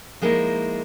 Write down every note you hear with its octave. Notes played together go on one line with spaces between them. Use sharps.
F3 G#3 A#3 D#4 E4